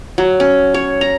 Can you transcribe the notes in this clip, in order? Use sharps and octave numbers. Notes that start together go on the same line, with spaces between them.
F#3
C#4
C#5
A#5